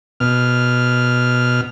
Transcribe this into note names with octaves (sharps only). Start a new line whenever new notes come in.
B2 F6